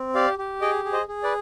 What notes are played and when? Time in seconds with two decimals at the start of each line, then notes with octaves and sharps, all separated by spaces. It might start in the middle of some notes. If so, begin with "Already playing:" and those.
Already playing: C4
0.15 G4 D5 F5
0.39 G4
0.61 G#4 D#5 G5
0.85 G#4
0.93 C5 D#5
1.08 G#4
1.23 B4 D5